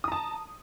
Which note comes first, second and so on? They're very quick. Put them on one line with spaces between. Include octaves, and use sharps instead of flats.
D#6 A#5 A5